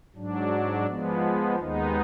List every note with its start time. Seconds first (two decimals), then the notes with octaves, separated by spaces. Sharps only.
0.14 G#2 F#3 D4
0.87 F3 G#3 B3
1.59 D#2 D#3 G#3 B3 D#4